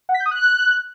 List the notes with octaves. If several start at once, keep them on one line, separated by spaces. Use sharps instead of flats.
F#5
B6
G6
D#6
F#6